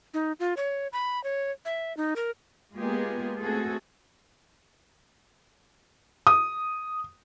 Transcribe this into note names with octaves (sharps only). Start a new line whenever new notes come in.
D#4
F4
C#5
B5
C#5
E5
D#4
A#4
G#3 A#3 B3 F4 G4 G#4
A3 C4 F#4 G#4 A4
D#6